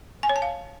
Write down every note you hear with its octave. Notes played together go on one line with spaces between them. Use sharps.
G#5
C#5
A5
F5